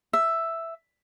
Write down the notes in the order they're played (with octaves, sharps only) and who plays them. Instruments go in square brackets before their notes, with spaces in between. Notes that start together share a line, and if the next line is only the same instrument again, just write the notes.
[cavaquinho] E5